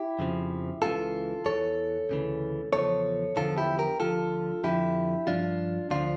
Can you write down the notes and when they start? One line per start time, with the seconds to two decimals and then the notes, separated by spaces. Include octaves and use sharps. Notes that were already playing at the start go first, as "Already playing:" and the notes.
Already playing: E4 G4
0.19 F2 C#3 F3
0.82 C#2 C#3 E3 F4 A4
1.46 E2 E3 A4 C#5
2.09 D2 C#3 E3
2.73 E2 C#3 F3 A4 C#5
3.36 E2 D3 F3 F4 A4
3.58 E4 G4
3.79 G4 A#4
4.00 D2 D3 F3 F4 A4
4.64 F2 D3 F3 E4 G4
5.27 G2 F3 D4 F4
5.91 D2 D3 F3 D4 F4